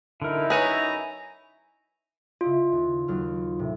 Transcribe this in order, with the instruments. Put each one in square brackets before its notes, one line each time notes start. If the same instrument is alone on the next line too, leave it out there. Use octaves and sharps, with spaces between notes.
[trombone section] F#2 D#4 E4 [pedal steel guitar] D3 A#4
[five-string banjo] G#4 B4 C#5 [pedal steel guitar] E5 G#5 [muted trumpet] A#5
[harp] C#3 E4 D#5 [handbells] F4
[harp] D#2
D#2 F#3 F6
A2 C3